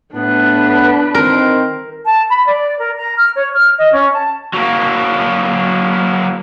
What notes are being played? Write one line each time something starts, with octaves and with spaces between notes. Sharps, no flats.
A2 B3 D4 B4
D#3 C4 A#4
A5
B5
D5
A#4
A#5
F6
C#5
F6
D#5
C#4
A5
F#3 A#3